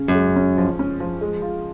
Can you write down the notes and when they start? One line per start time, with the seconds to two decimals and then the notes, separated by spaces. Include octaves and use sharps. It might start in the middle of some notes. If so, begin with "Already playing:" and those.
Already playing: C#3 C#4
0.08 F#2
0.14 G#3
0.36 C#4
0.58 F3
0.79 C#4
1.00 F3
1.21 G#3
1.42 F4